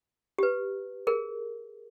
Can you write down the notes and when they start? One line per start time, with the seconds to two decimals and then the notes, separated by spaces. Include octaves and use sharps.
0.38 G4 B4
1.07 G#4 A#4